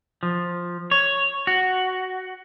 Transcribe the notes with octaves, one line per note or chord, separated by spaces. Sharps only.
F3
C#5
F#4